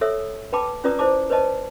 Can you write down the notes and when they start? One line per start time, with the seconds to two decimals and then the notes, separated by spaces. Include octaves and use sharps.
0.01 A4 C#5 E5 E6
0.53 B4 G5 A5 B5 D6
0.84 C#4 F4 B4 D5 A#5 D#6
0.99 E4 C5 D5 A5 D6
1.30 B4 C5 D5 D#5 A5